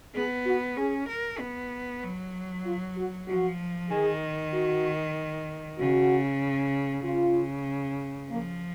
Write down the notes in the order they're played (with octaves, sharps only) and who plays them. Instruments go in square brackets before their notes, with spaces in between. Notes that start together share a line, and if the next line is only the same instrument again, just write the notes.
[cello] B3 [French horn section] G#4
[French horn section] F#4
[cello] C#4 [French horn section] G#4
[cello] A#4
B3
F#3
[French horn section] F4
F#4
[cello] F3 [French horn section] F#4
[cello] D#3 [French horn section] G#4
[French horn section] F#4
[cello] C#3 [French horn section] F#4
[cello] C#3 [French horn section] F4
[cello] F3 [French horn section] A#3